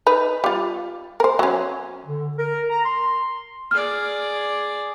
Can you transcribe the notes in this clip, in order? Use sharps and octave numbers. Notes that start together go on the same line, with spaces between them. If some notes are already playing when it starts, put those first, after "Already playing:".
D#4 B4
G3 F4
A#4 C5
F#3 C#4
D3
A#4
A#5
C6
G#4 D5 F6